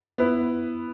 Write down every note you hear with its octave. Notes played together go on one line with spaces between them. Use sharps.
B3 E4 B4